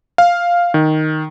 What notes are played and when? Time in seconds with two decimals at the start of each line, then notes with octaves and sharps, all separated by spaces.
0.18 F5
0.74 D#3